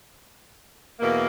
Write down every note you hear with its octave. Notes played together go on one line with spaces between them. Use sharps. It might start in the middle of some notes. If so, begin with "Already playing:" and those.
E2 B2 A#3